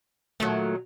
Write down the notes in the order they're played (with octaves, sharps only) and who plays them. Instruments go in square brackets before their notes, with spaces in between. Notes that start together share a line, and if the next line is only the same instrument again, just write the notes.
[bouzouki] A#2 D#3 F#3 [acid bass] A3